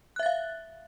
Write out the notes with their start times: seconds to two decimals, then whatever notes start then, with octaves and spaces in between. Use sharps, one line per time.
0.16 F#6
0.19 E5
0.23 A6
0.26 F5